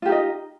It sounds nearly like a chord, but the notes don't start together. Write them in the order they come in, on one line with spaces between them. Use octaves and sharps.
F4 G4 D#4 D#5